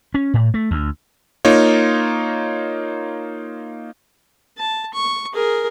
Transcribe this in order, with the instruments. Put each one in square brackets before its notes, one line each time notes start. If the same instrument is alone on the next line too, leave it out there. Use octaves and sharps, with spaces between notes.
[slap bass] C#4
A2
A3
D2
[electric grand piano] A#3 D#4 F4 C#5
[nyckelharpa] A5
C#6
G#4 A#4